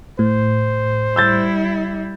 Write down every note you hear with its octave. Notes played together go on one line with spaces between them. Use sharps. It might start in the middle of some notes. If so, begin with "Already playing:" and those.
A2 C5
G3 E4 E6 G6 A6